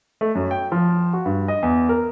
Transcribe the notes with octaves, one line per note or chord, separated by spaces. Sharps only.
A3
F#2
G5
F3
F#4
G2
D#5
E2
A#4